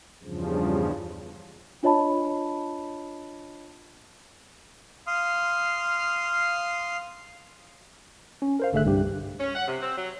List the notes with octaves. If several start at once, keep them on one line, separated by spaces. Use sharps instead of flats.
E2 G2 C#3 F3
D4 F4 C#5 D#5 A5 B5
F5 C6 D#6 F6
C#4
A#4 C5 F5
G#1 D3 A3 G#4 E5 F#6
C2 G2 G4
C#4
F#5
C3
C4
F#3